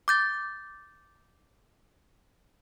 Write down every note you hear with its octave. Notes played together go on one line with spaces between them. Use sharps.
D6 G6 A6